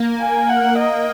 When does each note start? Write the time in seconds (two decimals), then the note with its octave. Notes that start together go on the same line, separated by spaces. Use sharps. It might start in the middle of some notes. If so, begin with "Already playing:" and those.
Already playing: A#3
0.21 G#5
0.49 F#5
0.78 D#5